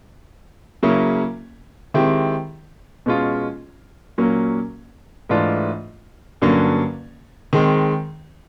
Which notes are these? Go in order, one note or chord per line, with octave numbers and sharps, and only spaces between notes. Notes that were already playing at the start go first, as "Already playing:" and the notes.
C#3 F#3 A#3 C#4 E4
D#3 G#3 C4 E4 G4
B2 G#3 C#4 F4
A#2 F#3 A#3 C#4
G#2 E3 A3 D4 F4
G2 D3 F#3 A#3 C#4
D#3 G#3 C4